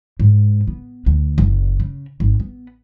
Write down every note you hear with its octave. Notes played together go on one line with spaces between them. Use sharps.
G#2
B3
D2
F#1
C#3
G#1
B3